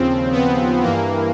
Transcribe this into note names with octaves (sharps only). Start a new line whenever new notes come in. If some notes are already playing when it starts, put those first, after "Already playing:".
Already playing: D#2 C#3 F3 C4
B3
G2 E3 A#3